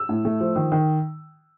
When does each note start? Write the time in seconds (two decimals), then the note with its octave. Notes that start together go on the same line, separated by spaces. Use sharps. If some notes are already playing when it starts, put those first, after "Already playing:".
Already playing: E6
0.09 A2
0.25 A3
0.40 F3
0.56 D#3
0.72 D#3